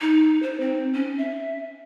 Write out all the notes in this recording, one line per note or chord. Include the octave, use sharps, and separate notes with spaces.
D#4
C5
C4
C#4
E5